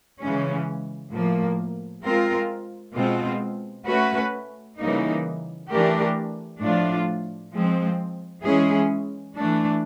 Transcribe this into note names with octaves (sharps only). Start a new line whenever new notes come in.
C#3 E3 G#3 C#4
A2 F3 A#3
G#3 C4 F4 A#4
B2 G#3 C4 F4
A3 C#4 F#4 B4
C#3 E3 G3 A#3 D#4
E3 A3 D4 G4 A#4
A2 F3 A3 D4 F4
F3 G#3 C4
E3 G#3 C#4 E4 G#4
E3 A3 D4